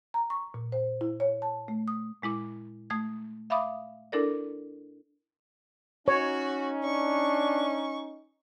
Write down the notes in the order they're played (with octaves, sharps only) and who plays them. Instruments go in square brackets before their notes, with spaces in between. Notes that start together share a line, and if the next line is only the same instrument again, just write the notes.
[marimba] A#5
C#6
A#2
C5
E4
C#5
A5
A3
D#6
A#2 G#3 E4 D6
A3 D#6 G#6
E5 F5 B5 D6 D#6
D4 E4 A4 A#4 D5
[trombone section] C#4 D#4 [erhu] F#4 [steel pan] C#5
[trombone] D4 [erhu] C#6